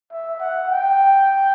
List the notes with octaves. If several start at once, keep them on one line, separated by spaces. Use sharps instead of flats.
E5
F#5
G5